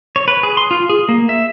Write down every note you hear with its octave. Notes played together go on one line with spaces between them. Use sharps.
C#5
B4
G#4
C6
F4
G#4
A#3
E5